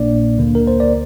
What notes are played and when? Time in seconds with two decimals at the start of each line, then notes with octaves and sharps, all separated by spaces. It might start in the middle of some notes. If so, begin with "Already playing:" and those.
Already playing: A#1 A#2 A#3 D4 D5
0.38 D2 D3 A#3
0.55 A#4
0.67 C5
0.80 D5